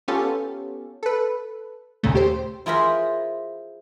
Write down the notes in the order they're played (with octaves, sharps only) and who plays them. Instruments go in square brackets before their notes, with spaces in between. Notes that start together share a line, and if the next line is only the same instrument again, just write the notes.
[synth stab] B3 C#4 F4 G4 A4
A4 B4
D#2 A#2 C#3 A3
G4 C5
[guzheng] E4 F4 G#4 A#4 C5 B5